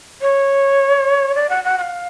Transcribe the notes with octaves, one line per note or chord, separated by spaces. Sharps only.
C#5
D5
F#5
F#5
F#5
F5